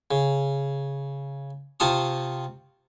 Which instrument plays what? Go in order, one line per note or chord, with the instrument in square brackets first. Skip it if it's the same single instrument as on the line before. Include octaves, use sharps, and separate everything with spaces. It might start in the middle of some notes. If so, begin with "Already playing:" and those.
[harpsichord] C#3
C3 F4 A5 C#6 D#6